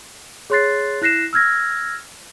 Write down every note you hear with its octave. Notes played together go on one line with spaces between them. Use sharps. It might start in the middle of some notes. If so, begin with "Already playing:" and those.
G#4 C#5 C6 F#6 A6 C7
E4 F#6 A#6 C7 E7
E6 F6 G#6 A#6